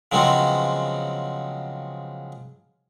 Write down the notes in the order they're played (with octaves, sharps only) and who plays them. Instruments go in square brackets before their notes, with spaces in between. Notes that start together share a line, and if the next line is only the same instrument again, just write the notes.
[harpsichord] C#3 F3 F#3 G#3 B3 C4